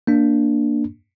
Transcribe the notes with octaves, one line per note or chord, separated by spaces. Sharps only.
A#3 D4